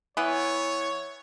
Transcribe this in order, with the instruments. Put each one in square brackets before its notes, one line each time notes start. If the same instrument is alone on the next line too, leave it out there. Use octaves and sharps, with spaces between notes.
[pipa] E3 B3 [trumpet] C#5